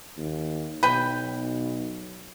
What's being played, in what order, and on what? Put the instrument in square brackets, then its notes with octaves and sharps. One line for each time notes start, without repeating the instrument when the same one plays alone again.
[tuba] D#2
[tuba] B1 [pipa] B4 G5